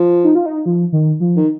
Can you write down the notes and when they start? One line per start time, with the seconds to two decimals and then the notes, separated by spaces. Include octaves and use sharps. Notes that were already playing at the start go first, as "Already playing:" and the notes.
Already playing: F3
0.24 D#4
0.35 F4
0.46 D#4
0.66 F3
0.92 D#3
1.20 F3
1.36 D#3